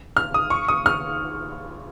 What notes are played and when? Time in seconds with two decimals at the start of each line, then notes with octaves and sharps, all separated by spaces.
0.17 F6
0.34 D#6
0.50 C#6
0.68 D#6
0.86 F6